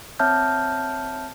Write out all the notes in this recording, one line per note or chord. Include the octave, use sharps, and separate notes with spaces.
C4 C#5 E5 A5 F6 G6